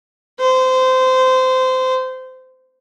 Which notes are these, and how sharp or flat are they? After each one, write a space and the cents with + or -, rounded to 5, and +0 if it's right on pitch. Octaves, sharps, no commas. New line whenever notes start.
C5 -20